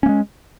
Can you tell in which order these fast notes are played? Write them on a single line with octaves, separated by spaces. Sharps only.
C#4 A#3 G#3